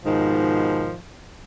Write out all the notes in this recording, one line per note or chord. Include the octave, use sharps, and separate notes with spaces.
G#2 B2 D#3 F3